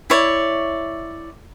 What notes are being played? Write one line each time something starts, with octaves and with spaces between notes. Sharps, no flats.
E4 C#5 D5